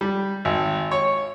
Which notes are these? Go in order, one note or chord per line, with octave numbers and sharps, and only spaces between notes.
G3
G#1
C#5